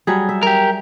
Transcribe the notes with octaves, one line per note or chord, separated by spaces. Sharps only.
F#3 G3 G#4
E5
G4 A#4